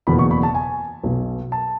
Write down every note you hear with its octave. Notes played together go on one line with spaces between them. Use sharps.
F#1 E2 B2 B5
C#6
B5
A5
G#5
B1 B2
A5